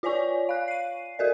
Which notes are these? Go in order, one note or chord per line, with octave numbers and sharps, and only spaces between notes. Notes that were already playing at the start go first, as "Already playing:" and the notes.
F4 C#5 D5 G#5 C#6
F5 F#6
C7 D#7
F#4 A4 A#4 D5